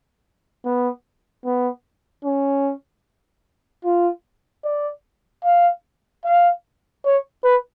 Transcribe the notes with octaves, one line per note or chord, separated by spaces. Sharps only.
B3
B3
C#4
F4
D5
F5
F5
C#5
B4